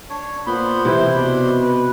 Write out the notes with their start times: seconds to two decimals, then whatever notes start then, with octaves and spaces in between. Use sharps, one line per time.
0.09 D4 C#5
0.47 A#2 B3 C5 B5 C6
0.85 C3 E3 E4
1.16 B2 D4
1.62 B4